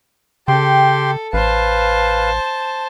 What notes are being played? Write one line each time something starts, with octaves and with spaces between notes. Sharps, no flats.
C#3 G4 A4 G5 C6
A1 B4 C5 F5 A5